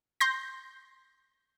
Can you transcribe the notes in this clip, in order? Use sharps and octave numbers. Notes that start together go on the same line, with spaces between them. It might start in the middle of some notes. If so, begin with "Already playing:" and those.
C6 G6 A#6